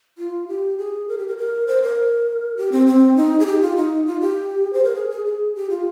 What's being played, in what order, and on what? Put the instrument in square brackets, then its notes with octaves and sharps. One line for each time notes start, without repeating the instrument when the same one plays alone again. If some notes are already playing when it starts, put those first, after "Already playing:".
[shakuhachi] F4
G4
G#4
A#4
G4
A#4
A#4
C5
A#4
G4
C4
C4
D#4
G#4
G4
F4
D#4
F4
G4
C5
A#4
G#4
G#4
G#4
G4
F4